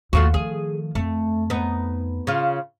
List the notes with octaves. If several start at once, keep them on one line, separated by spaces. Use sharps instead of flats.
D#2 A3 F4 F#4
D#3 F3 G#4
F2 A3
B3 D#4
C#3 F4